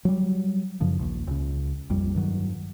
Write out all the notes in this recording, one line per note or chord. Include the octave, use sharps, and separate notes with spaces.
F#3 G3
F#2 C#3 F3
A#1 D#2
C#2 C#3
A#1 F2 G3
G2 D#3 F#3